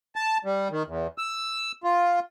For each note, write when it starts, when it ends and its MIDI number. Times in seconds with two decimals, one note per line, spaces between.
0.16 0.38 81
0.45 0.68 55
0.71 0.83 51
0.87 1.07 40
1.18 1.72 88
1.84 2.20 65